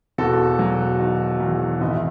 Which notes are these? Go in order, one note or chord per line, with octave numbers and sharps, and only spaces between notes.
E1 F#4 A4
F#3
D#3
E2
G#1 D#5
E5